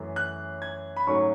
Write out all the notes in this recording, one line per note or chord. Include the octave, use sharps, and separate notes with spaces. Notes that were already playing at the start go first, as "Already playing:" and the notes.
Already playing: F#2 E3 A3 C#4
F#6
G#6
B5
G#2 F#3 A3 C#4 C#6